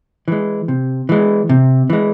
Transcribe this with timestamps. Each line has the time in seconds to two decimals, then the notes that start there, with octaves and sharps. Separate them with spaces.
0.28 E3 G#3
0.68 C3
1.09 E3 G#3
1.49 C3
1.90 E3 G#3